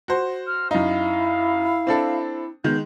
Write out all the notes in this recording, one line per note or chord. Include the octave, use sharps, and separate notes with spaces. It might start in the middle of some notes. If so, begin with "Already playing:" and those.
F#4 C5
F6
F#2 D#4 E4 F5
C4 D4 A4
D#3 G#3 B3 G6